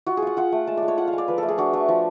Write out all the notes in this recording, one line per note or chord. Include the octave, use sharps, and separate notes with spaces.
F4 F#4
G#4
F4 F#5
F4 F#5
A3
G#3 A5
D5
G#3
C#5
F4 F#5
F5
G#3
D5
F3 B4
A3 A4
G#4
D4 F#4
A3
F3